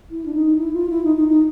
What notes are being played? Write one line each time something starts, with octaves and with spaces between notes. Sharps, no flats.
E4
D4
D#4
E4
F4
E4
D#4
D#4
D#4